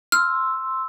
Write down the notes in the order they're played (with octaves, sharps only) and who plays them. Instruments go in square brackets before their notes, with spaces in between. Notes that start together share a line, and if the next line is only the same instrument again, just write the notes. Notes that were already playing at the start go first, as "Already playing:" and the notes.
[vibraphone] C6 E6 [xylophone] F6